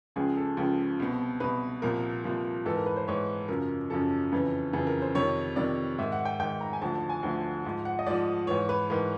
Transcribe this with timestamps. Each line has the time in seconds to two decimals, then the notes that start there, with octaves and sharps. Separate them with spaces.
0.16 C#2 C#3 F3 G#4
0.37 A4
0.57 C#2 C#3 F3
1.00 C2 B2
1.40 C2 B2 B4
1.82 C2 A#2 F3 A#4
2.24 C2 A#2 F3
2.65 G#2 E3 A4
2.76 A#4
2.86 B4
2.96 C5
3.07 G#2 E3 C#5
3.48 F#2 C#3 F3 A#4
3.90 F#2 C#3 F3 A4
4.32 F2 C#3 E3
4.73 F2 C#3 E3 G#4
4.87 A#4
5.02 C5
5.15 F2 C3 D#3 C#5
5.56 F2 C3 D#3 D5
5.98 G#2 D#3 E5
6.12 F#5
6.25 G5
6.39 G#2 D#3 G5
6.61 A#5
6.73 G#5
6.82 D2 D3 F3 A5
6.95 A5
7.09 G#5
7.23 D2 D3 F3
7.64 G#2 F3 A5
7.85 F#5
7.99 D#5
8.07 G#2 F3 D5
8.47 G#2 E3 C#5
8.69 B4
8.90 G#2 E3 A#4